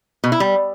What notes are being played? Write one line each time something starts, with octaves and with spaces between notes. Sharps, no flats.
B2
E4
G3